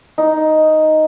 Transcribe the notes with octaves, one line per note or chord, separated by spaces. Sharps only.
D#4